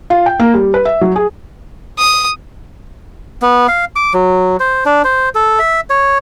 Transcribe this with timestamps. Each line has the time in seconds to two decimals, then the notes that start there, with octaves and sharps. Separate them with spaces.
0.10 F4
0.26 G5
0.40 A#3
0.54 G3
0.74 B4
0.85 E5
1.01 F#3
1.16 G#4
1.98 D#6
3.42 B3
3.68 F5
3.96 D6
4.14 F#3
4.60 C5
4.85 D4
5.04 C5
5.35 A4
5.59 E5
5.90 C#5